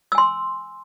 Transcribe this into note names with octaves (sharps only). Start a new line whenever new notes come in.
G#5 C6 E6